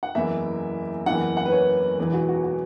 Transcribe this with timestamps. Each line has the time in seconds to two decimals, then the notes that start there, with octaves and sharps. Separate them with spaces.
0.03 F#5
0.15 F#1 E2 E3 E5
1.06 F#1 E2 E3 F#5
1.37 F#5
1.46 B4
1.52 C#5
1.98 E1 E2 E3 B4
2.13 F#4
2.29 F#4
2.44 F#4